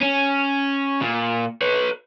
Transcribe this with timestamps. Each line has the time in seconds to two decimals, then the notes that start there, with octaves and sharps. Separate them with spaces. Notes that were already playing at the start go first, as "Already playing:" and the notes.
0.01 C#4
1.02 A#2
1.62 B4 C#5